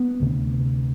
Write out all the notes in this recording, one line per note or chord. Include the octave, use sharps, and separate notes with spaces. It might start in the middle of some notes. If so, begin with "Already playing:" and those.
Already playing: B3
D2 C3